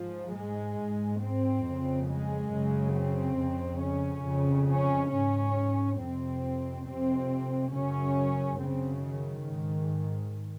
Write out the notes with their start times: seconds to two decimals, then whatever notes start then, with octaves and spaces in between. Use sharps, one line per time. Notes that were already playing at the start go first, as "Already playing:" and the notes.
Already playing: G#2 F3
0.34 G#3
0.77 G#2
1.20 C4
1.64 F2 C#3
2.08 G#3
2.51 F#2 C#3
2.95 C4
3.38 F2 C#3
3.81 C#4
4.25 F2 C#3
4.68 C#4
5.11 G#2 C#4
5.98 F2 C3 C4
6.85 F2 C3 C4
7.72 F#2 C#3 C#4
8.59 F#2 C#3 C4
9.02 D#3
9.46 G#2